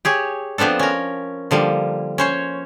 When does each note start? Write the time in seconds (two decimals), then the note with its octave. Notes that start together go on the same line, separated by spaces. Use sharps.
0.05 G4 G#4 C#5
0.58 F3 B3 C4 D4 A4
0.79 C#4 A#4
1.51 D3 F3 G3 A#3
2.18 C#4 C5 C#5